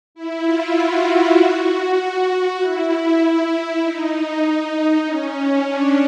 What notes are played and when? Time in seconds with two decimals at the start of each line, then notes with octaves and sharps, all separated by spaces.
0.15 E4
0.44 F4
0.75 F#4
1.37 F#4
1.98 F#4
2.59 E4
3.82 D#4
5.06 C#4
5.67 D4